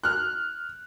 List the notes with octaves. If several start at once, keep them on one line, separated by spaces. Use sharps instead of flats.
F6 F#6